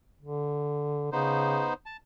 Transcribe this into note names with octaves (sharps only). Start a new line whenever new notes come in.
D3
C#3 B3 D#4 C5
A5